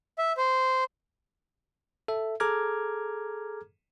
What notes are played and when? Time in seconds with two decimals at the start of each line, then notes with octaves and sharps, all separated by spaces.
0.18 E5
0.37 C5
2.08 A4 E5
2.40 G#4 A4 A#5 D6 F6 G#6